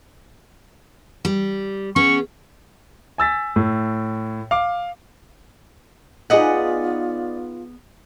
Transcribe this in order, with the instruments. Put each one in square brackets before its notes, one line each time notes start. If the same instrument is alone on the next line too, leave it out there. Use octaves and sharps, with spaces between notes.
[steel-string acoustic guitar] G3
[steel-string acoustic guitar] B3 C#4 G#4 [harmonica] C#6
[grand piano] G#5 E6 A6 B6
A2
F5 D6
[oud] B3 D#4 G#4 [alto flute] F4 [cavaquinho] D5 D#5 F#5